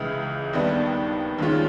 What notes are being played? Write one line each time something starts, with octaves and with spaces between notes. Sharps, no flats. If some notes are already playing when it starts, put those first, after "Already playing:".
Already playing: C#2 C#3 E3 G#3
D#2 D#3 G3 B3 D4
D#2 D#3 G#3 C#4 F4